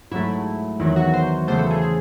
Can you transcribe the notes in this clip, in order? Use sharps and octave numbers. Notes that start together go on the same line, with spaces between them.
G#2 F#3 A3 E4
E2 D#3 F#3 E4
F#4
C5
E2 C#3 E3 A3 C5
A4
G#4
G#4